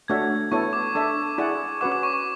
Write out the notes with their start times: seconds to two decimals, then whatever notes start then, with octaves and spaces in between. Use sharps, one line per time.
0.08 A3 D4 F#4 C#5 E5 G#6
0.52 B3 E4 A4 C#5 C#6
0.73 D6
0.95 D4 A4 E5
1.38 E4 G#4 D5 F#5
1.81 C#4 F#4 B4 F#5 D6
1.92 D6
2.03 C#6
2.13 C#6